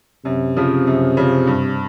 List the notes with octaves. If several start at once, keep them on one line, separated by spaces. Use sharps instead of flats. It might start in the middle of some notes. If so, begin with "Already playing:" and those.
F#2 C3
C#3 F3
F#2
C#3 F3
G2